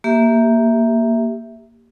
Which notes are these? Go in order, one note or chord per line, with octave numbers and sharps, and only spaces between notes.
A#3 G4 E5